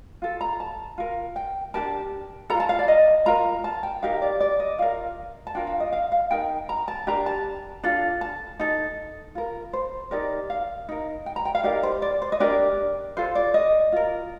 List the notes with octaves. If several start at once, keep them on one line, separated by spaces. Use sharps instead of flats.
F4 A4
A#5
A5
F4 A#4
G5
D4 G4 A#4 A5
A4 A#5
F4
A5
F5
D5
D#5
F4 A#4 A#5
A5
G5
D#4 G4 A#4 F5
D5
D5
D#5
F4 A#4 F5
A5
D4 F4 A#4 G5
F5
D#5
F5
F5
D#4 A#4 G5
A#5
A5
D4 G4 A#4 A#5
A5
D4 F4 A4
A5
D#4 A4
F4 A#4
C5
D#4 G4 A#4 D5
F5
D#4 A#4
G5
A#5
G5
F5
D#4 G4 A#4 D5
C5
D5
C5
D#5
D4 G4 A#4 D5
F4 A4 C5
D5
D#5
F4 A#4